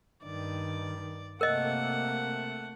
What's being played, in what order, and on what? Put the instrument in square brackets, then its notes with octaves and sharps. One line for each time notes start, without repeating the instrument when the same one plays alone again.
[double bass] G2 D#3 [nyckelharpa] D5
[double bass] C3 A#3 [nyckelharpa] A3 F#5 [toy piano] A#4 D#5